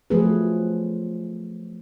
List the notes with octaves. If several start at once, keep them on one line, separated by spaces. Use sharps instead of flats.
F3 F#3 A3 B3 G#4 B4